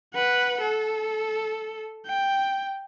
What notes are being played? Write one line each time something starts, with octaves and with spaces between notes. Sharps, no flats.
B4 F#5
A4
G5